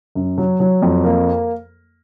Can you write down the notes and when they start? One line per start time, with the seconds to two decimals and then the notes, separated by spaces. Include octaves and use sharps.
0.15 F#2
0.38 F#3
0.60 F#3
0.82 F2
1.04 A#3